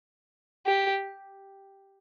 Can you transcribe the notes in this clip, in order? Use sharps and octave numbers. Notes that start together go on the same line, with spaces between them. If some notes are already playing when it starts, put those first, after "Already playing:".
G4